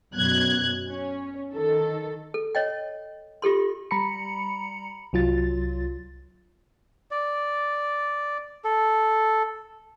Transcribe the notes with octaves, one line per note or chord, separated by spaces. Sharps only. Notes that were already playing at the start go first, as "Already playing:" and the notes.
F#2 B2 F#6 G#6
C#4
D#3 A4
A4
C#5 D#5 G5
F4 G4 A4 C6
G3 A#5 B5 C#7
C2 F#3 F4 A6
D5
A4